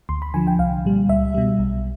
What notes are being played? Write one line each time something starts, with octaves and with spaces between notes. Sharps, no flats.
D2 C6
B5
D3 F3 G#5
G5
C2 F5
A#2 G3
C#2 E5
B2 G3
B1